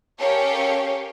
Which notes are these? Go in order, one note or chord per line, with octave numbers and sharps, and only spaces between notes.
C#4 G4 A4 A#4 C#5 F5